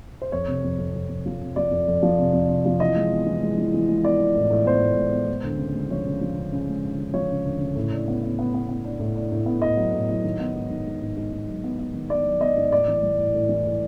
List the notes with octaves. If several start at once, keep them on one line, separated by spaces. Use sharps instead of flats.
C5
F2 C#5
C3
F2
F2
F2
F2
F3
C3
F3 D5
F2
F2
F3
C3
F2
C3
F3
E3 D#5
G#3
B3
E3
G#3
E3
E3
G#3
B3 D5
E3
A2
A2
B3 C5
A2
G#3
B3
G#3
D2
C#3
G#3
F3 C#5
C#3
F3
C#3
C#3
G#3
D2
C#3
F3 C#5
C#3
D2
C#3
A2
D4
B3
B3
B3
B3
B3
D4
A2
D4
A2
B3
A2 D#5
F#3
A2
F#3
D#3
B3
G#2
D#3
G#2
G#2
G#2
G#2
F#3
B3
B3
D#3
B3 D5
F#3
B3 D#5
G#2
A2 D5
E3
G3
A2
A2
E3
A2